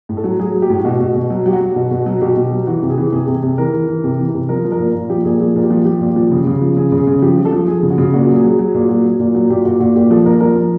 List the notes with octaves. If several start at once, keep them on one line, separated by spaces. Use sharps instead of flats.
A2
A4
F#3
F#3 G#4
F#3
G4
A2
B2 F#4
B2
B2
F#3
F#3 G4
F#4
F#3
B2
B2
F#3
B2 G4
B2
F#3
E3 F#4
C3
G#4
E3
C3 G#4
C3
G#4
C3
E3 A#4
E3
E3
C3
E3
C3
F3 A#4
F3
A#4
A#2
A#2
F3 G4
A#2 G#4
F3 G#4
A#2
G4
F3
F3 G4
A#2
F3
C#3
C#3
F3
C#3 G#4
C#3
G#4
C#3
F3 G4
F3
A4
F3
F3 G#4
C#3
F#4
C#3
A#2 F#4
F#3
G#4
F#3
F#3
A#2
F#3
F#3
A#2
F#3
A#2 G4
A#2 F#4
A#2 F#4
A#2 G4
F3 A4
A#2 A#4
F3 A#4
F3